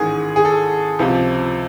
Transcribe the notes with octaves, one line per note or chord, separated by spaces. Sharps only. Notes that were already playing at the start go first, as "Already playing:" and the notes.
Already playing: A1 G#2 D#3 G#4
G#4
A4
C#2 C3 F3